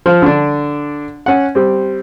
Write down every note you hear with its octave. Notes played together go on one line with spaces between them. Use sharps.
F3
D3 D4
C#4 F#5
G3 C4